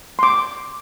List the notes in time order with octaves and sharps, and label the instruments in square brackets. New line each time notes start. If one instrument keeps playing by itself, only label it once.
[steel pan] C6 D6